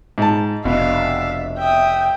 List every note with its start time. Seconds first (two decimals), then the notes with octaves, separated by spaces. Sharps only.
0.18 G#2 A5
0.65 F1 B2 D4 E5 F5
1.58 E5 G5 D#6